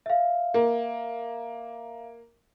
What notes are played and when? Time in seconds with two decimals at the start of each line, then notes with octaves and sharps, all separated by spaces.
0.06 E5 F5
0.54 A#3